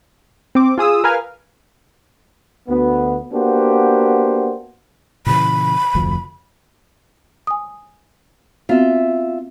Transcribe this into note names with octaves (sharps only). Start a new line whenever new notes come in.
C4 D6
F4 G#4 D#6 E6
A#4 B4 F5 G#5 F6
D2 B3
A#3 B3 D4 F#4 G4 C5
A#2 C#3 E3 B5
F1 D2 F3
G#5 D#6
B3 C4 F4 F#4 E5